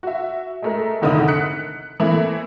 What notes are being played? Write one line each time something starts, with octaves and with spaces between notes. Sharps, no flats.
F#4 E5
G#3 A3 A#4
F1 G#2 D3 D#3 E4 D#6
F#6 B6 C#7
E3 A3 A#3 C4 E4